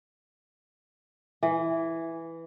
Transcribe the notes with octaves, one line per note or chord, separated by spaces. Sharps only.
E3